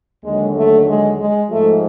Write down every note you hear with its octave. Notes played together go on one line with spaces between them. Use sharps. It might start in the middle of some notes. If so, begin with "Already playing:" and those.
D#2 D3 F#3 G#3
A3
G#3
G#3
G#2 F3 A3